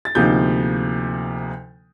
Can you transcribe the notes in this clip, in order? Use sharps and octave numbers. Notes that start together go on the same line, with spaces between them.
A6
D2 C3 F3 A#3 D#4 G6